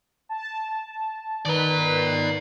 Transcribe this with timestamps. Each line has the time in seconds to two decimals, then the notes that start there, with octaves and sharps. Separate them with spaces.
0.29 A5
1.45 D#3 B4 D5 A#5